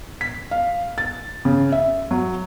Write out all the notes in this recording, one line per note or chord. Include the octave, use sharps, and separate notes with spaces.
B6
F5
A6
C#3
E5
F#3